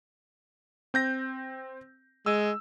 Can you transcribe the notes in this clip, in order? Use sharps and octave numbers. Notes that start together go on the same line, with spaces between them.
C4 G6 A#6
G#3 E6